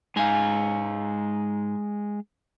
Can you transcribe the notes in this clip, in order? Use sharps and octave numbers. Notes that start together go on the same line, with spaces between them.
G#2 G#3 D#4 F5 G#5